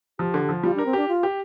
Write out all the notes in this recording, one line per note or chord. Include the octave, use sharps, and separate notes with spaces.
F3 G4
D3
F3
G3 F4
D4
A#4
C4
D4 G4
F4
G4